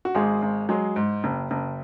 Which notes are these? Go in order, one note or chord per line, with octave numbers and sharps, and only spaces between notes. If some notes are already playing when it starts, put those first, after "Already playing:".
F#4
G#1 G#3 G#4
G#1
F#3 G#3 G#4
G#2
F#1
F#1